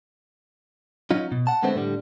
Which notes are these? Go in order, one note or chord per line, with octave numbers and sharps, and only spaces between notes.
F#3 C#4 D#4 F4
B2
F#5 A5
D3 G#3 A3 B3 C4 C5
A2 D3 G3